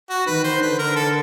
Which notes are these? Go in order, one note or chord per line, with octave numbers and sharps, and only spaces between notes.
F#4
D#3 B4
C5
D3 B4
A#4
A4